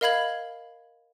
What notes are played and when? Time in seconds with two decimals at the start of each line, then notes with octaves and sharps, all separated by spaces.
0.01 A#4 D#5 F5 B5 G#6 F#7